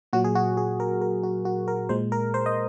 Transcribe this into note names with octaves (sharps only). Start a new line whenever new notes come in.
A#2 F#3 F#4
G#4
F#4
G#4
A#4
A#4
F#4
F#4
A#4
A#2 G#3 C5
A#4
C5
D#5